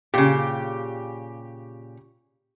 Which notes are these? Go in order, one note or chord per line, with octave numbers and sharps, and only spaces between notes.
A#2 C#3 G4